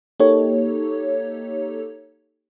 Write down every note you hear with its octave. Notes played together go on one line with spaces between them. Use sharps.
A#3 D#4 G4 A4 C#5